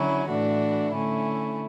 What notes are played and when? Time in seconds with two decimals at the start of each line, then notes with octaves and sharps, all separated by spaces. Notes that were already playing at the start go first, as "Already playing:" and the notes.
Already playing: D3 F#3 C#4 E4
0.29 A2 E3 A3 D4 F#4
0.93 D3 A3 C#4 E4